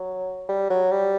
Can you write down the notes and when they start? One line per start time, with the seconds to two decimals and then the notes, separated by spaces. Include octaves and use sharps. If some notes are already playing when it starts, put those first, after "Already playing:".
Already playing: F#3
0.49 G3
0.70 F#3
0.91 G3